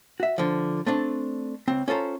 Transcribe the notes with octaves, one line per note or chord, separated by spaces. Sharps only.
F#4 E5
D3 F3
A3 C4 D4
C#2 C4
C#4 F4 A4 C5 A#5